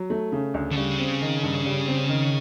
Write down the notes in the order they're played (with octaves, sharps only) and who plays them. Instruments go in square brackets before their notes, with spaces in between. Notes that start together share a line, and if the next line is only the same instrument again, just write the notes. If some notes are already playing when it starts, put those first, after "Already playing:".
Already playing: [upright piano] F#3
A3
C#3
D2
[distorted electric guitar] D3
[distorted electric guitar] C#3 [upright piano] G3
[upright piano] C4
D#3
G2
G3
C4
D#3